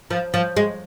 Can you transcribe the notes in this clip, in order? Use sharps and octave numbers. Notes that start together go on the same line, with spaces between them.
F3
F3
G#3